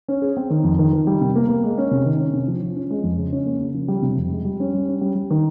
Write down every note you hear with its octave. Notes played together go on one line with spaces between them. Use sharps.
C#4
G#4
C4
D#3
F2
D#3
D#3
G3
C3
A#3
A#3
G#3
C#4
C3
D#3
C#4
C3
F3
F3
C#4
G#3
F2
C#3
C#4
A#3
C#3
F3
G3
C3
F2
G#3
G3
C#4
G3
C#4
G3
G3
D#3